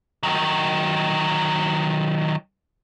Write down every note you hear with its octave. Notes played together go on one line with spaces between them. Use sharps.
D#3 F#3